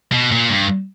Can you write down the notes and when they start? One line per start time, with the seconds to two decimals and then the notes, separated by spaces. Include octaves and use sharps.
0.12 B2
0.31 A#2
0.50 G2